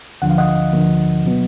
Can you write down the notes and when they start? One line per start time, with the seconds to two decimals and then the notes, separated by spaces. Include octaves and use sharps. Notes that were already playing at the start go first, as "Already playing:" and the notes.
0.22 D2 D3 F3 F#5
0.30 F5
0.38 D#5 F#5
0.73 D2 D3 F3 A#3
1.24 B2 F#3 B3